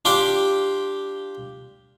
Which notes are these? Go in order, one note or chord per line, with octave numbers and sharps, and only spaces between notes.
D4 F4 G4 G5 C6